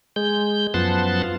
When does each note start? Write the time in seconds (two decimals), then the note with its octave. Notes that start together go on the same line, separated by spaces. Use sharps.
0.16 G#3 G6
0.74 F#2 F3 B3 F#5 A5 C6
1.24 F4